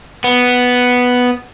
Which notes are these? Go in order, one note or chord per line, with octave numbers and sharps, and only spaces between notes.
B3